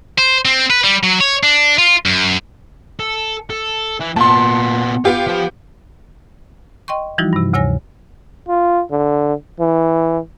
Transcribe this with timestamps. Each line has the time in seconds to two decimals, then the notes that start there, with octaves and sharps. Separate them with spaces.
0.18 C5
0.45 C4
0.70 B4
0.84 G3
1.03 F#3
1.21 C#5
1.43 D4
1.78 F4
2.06 F#2
2.99 A4
3.50 A4
4.00 E3
4.16 A#2 B3 A5 C6
5.05 B3 F4 G4 F5
5.27 F3 A5
6.88 D#5 G5 C6 C#6
7.18 E3 F3 G3 D#4 E4 F#4
7.33 G2 C3
7.53 D2 C3 C#5 G#5 A#6
8.48 F4
8.91 D3
9.60 E3